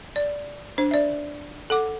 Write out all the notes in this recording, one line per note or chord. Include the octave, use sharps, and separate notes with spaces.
D5
D4 C5
D5 E5
A4 F#5 D6